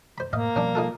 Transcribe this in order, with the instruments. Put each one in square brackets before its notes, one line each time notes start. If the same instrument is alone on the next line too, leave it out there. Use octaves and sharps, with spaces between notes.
[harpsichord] C5 B5
[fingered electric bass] A2 [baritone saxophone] A#3 [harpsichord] D#5 F5
[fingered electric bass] B2 F3 G3 [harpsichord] C#4 D4
[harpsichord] D#4 F4 A4